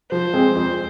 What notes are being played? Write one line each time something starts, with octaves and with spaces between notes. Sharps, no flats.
F3 C5
G#3 C4 G#4
F2